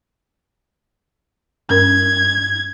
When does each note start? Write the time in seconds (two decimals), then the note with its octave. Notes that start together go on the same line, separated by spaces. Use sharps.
1.70 G2 C#4 A#4 G#6